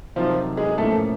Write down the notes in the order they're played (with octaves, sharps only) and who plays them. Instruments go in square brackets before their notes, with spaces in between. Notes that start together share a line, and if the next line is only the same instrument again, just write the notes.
[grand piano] C3 D#3 F#3 [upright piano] F3 F4
[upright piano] G#3 G#4
[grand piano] A2 F3 A#3 C#4 [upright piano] A3 A4